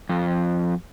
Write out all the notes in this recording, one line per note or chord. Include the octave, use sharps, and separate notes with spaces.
F2